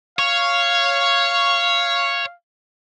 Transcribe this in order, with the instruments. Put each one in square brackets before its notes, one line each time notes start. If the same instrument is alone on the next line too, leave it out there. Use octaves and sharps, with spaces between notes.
[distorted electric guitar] C#5 [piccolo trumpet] F5